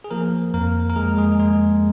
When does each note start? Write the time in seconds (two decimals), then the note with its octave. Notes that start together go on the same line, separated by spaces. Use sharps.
0.04 G#4
0.11 F3 A#3 A#4
0.54 F2 A#3 A#4
0.90 A#4
0.96 G#3 G#4
1.17 G#3 G#4
1.39 G#3 G#4